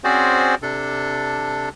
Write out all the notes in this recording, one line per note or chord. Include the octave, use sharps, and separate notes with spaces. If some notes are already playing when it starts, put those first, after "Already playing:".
C4 C#4 F#4 G#4 C5 D5
C3 D4 A4